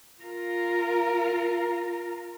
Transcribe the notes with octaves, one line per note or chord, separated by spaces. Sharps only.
F4 A#4